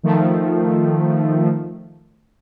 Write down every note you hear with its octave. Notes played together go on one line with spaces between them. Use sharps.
D#3 F3 A3